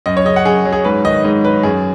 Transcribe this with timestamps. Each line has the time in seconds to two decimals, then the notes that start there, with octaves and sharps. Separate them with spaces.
0.06 F#2 D#5
0.17 C#5
0.25 C#3 D#5
0.36 F#5
0.45 F#2 G#4
0.65 F#3
0.73 G#4
0.84 G#2 B4
1.05 D#3 D#5
1.24 G#2 D#5
1.44 F#3 B4
1.63 F#2 G#4